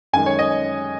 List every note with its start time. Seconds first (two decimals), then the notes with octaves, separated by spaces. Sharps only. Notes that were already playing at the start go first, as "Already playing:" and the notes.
0.13 F#2 D#3 G#3 G#5
0.26 C#5
0.39 D#5